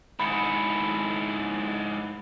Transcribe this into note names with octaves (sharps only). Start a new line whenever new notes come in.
G#2 E4 B5 C#7